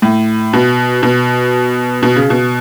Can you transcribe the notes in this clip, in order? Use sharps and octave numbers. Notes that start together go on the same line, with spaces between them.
A2
B2
B2
B2
C#3
B2